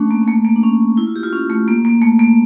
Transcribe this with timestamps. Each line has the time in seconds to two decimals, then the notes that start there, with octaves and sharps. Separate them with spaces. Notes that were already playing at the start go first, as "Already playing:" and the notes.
Already playing: A3 C#4 D4
0.11 A#3
0.23 A#3
0.28 A3
0.45 A#3
0.56 D4
0.63 C#4
0.97 E4
1.07 F4
1.16 G4
1.23 F4
1.33 C#4
1.50 A3
1.68 A#3
1.85 A#3
2.02 A3
2.19 A#3